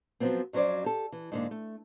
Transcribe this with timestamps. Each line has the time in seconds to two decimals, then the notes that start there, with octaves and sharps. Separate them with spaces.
0.20 F3 F#3 A3 B3 C4
0.53 F2 F#3 C#4 C5 D5
0.84 G4 A4
1.12 E3
1.32 G#2 D3 A#3
1.51 A3